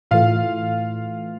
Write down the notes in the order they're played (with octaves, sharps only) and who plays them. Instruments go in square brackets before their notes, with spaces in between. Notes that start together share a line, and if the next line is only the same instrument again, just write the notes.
[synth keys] A2 E3 A3 [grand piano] F4 F5